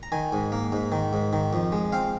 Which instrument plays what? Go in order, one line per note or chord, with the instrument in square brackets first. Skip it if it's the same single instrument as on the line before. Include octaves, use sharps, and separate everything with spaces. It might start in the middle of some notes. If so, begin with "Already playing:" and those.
[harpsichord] A#5
D#3 G#5
G#2
A#3
G#2
D#3
G#2
D#3
F2
G#3
C4 F5